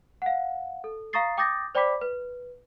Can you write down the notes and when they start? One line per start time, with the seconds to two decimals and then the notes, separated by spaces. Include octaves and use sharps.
0.22 F5 F#5
0.84 A4
1.13 F5 A#5 C#6 D#6 A6 C7
1.38 G5 D6 D#6 G6 A6 A#6
1.75 C5 D5 G5 B5 D6 B6
2.01 B4